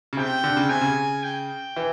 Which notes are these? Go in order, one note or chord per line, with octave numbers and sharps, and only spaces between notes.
C#3
C3 G5
D3
C#3
C3 G#5
C#3
G5
E3